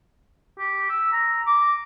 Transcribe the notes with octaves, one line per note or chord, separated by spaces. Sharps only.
G4
E6
A#5
D6